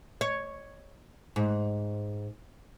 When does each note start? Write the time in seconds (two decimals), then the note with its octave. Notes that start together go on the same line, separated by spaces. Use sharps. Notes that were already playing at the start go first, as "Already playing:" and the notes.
0.21 C#5
1.36 G#2